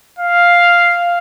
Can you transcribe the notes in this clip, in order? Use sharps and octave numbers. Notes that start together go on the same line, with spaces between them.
F5